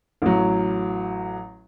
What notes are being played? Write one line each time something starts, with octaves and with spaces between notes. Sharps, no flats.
A1 F#3